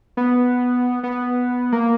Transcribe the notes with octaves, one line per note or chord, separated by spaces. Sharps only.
B3
B3
A#3